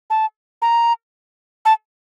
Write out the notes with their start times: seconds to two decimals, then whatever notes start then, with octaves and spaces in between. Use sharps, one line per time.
0.10 A5
0.62 A#5
1.65 A5